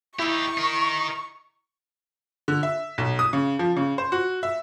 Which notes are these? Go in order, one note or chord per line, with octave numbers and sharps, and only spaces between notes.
D#4 E4 G4 C#6
D#4 A#4
D3
E5
B1
D#6
C#3
F3
C#3
C5
F#4
E5